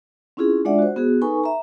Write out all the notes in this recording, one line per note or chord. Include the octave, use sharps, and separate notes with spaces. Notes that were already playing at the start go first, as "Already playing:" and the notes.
C4 C#4 E4 F4 G#4
G#3 D4 F4 D5 E5 F#5
F#4 C5
B3 F#4 G#4
D#4 A4 B4 G#5 B5 C#6
E5 A#5